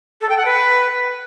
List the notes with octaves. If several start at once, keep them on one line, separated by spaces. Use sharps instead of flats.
A4
G5
F#5
B4